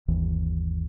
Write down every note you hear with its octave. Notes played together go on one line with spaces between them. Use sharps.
G1 D#2 E3